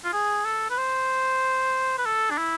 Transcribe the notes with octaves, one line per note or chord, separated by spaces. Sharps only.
F4
G#4
A4
B4
C5
B4
A4
D4
E4